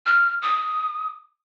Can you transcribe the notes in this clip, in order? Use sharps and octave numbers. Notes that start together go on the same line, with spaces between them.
F6
D#6